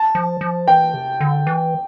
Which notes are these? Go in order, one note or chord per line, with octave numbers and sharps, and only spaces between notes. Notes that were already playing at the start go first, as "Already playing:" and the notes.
Already playing: A5
F3
F3
E3 G5
C3
D3
E3